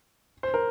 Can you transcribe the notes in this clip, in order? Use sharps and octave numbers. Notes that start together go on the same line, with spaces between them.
C5
A#4